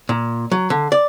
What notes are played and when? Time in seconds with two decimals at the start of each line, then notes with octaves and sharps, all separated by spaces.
0.09 A#2
0.51 F#3
0.70 D3
0.92 D5